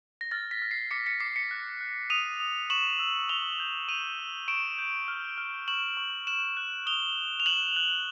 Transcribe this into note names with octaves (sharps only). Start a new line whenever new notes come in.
A#6
F6 A6
B6
F6
C7
D6 B6 C#7
B6 C#7
D6 C7
B6 C#7
F#6
F#6
D#6 D#7 F7
D#6
C#6 E7 F#7
E6
C#6 F7 G7
G6
C#6 D#7 F7
E6
C#6 D7 E7
G6
F6
F6
C#6 E7 F#7
C#6
F#6 E7 F#7
F#6
D#6 F7 G7
D#6
F7
F#6 E7 F#7
F#6